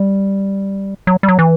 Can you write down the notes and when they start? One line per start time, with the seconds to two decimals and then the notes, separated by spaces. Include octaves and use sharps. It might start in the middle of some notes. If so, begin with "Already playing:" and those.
Already playing: G3
1.07 F#3
1.23 G3
1.28 F#3
1.39 E3